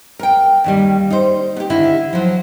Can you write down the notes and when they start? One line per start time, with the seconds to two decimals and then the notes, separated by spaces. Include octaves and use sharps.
0.19 A#4 G5
0.64 D#2 D#3 G3
1.10 D#4 C5
1.57 B3 G4
1.70 D3 D#3 E4
2.13 F3 F#3